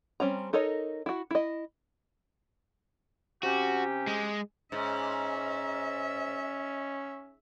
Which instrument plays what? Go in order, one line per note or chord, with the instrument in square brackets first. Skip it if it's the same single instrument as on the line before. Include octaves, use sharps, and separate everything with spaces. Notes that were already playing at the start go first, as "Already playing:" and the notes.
[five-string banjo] G3 C4 C#4 A#5
D#4 A4 A#4 C#5 D#5
E4 F#4
E4 D#5
[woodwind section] C3 C#4 G4 [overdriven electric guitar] F#4
[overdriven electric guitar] G#3
[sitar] G#2 [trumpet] C#4 [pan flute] D#5 [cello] E5